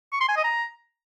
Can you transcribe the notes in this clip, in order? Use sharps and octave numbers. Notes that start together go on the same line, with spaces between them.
C#6
C6
G#5
D#5
A#5